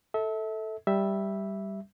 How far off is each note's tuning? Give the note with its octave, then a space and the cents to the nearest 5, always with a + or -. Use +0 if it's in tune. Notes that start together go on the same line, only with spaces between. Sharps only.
A4 +0 E5 -30
G3 +0 E5 +0